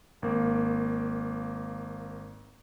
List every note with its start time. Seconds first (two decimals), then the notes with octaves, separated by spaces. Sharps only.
0.22 G#1 A#3